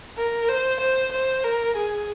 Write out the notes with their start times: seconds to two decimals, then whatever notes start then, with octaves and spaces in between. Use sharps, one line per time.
0.17 A#4
0.49 C5
0.80 C5
1.12 C5
1.44 A#4
1.76 G#4